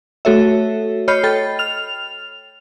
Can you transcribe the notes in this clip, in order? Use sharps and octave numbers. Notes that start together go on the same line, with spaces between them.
A3 F#4 A4 C#5 E5
C#5 D#5 B5 F6 G6 C7
A4 G5 B5 A6
F6 F7